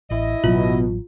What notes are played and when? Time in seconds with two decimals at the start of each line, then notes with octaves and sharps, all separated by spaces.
0.11 A1 E4 D#5
0.44 A1 B2 F#3 F4